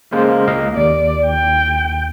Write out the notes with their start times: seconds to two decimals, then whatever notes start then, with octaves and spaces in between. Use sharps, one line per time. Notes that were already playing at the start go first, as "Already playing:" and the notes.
0.13 C#3 G#3 A#3 C5
0.48 C#2 D#5 F5
0.77 D#2 D5
1.27 G5